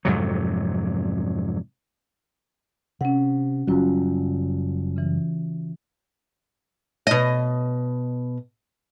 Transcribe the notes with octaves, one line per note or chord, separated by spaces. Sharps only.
F2 G#2 C3 F#3
C3 C#4 F#5
F#1 F#3 G3 C#4 F4 F#4
C#3 E3
B2 D#5